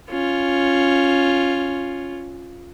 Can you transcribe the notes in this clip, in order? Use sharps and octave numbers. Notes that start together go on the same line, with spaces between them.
C#4 F4